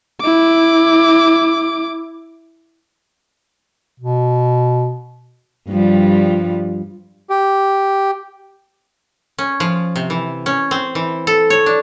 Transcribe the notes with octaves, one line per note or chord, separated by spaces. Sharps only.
E4 D6
B2
G2 F3 G3
G4
C#4
F3
C3
E3
C#4
C4
E3
A4
C#5
D4